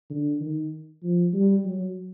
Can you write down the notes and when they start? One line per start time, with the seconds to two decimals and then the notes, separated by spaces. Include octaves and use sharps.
0.10 D3
0.40 D#3
1.03 F3
1.33 G3
1.65 F#3